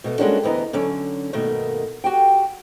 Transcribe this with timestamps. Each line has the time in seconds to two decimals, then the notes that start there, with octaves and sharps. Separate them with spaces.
0.04 B2 A3 B3
0.19 G3 G#3 A#3 C#4 D4 F#4
0.43 D2 E3 B3 D#5 A#5
0.73 D3 F#3 C#4
1.33 G2 B2 D#3 A3 A#3
2.04 F#4 G4 G5